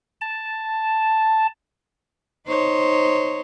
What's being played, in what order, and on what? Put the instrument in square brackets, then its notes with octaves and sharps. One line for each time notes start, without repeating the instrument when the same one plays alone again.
[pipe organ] A5
[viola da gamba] D#4 C5 C#5